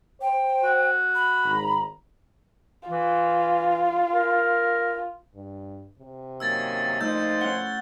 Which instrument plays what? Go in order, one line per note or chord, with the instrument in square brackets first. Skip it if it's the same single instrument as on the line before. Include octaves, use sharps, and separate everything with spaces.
[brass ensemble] C5 [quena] G5
[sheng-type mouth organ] F#4
[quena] B5
[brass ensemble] G#1 A#5
[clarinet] E3 [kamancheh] F4
[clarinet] A#4
[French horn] G2
C3
[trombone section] F#2 D#3 A#3 [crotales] E6 G#6 A6
[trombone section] F2 A#2 C5 [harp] A3 [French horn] D#4 [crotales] E6 G6
[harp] C#4 E4 F#5 [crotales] G7